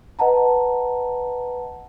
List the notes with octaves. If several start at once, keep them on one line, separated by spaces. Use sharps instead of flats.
B4 D#5 F#5 A5 A#5